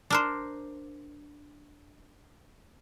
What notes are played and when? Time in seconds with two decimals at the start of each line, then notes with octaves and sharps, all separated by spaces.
0.10 D4 A#4 C5